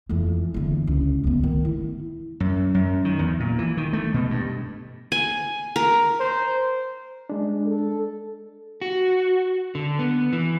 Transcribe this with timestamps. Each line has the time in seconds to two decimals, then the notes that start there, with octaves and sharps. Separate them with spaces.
0.09 F2 E3
0.54 E2 D3
0.87 C#2
1.24 D2 B3
1.44 D#3
1.65 E4
2.40 F#2
2.74 F#2
3.05 D#3
3.19 E2
3.40 A#2
3.58 E3
3.77 D#3
3.93 A3
4.14 B2
4.31 G2
5.12 G#5
5.76 A#4
6.20 C5
7.30 G#3 D4
7.66 A4
8.81 F#4
9.75 D3
9.99 B3
10.33 E3